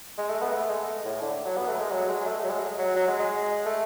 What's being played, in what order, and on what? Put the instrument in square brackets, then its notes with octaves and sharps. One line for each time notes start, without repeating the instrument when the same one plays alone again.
[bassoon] G#3
A3
B3
A3
G#3
A2
D3
F#3
B3
A3
G#3
F#3
G#3
A3
F#3
G#3
F#3
F#3
G#3
G#3
A3